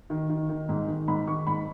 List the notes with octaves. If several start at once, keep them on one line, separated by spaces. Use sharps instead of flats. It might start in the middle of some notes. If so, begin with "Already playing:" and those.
D#3
D#3
D#3
G#2
D#3
G#2 B5
D#3 C#6
G#2 B5